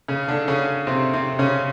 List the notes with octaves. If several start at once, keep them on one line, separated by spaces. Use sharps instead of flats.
C#3 C#4
D3 D4
C#3 C#4
C3 C4
C3 C4
C#3 C#4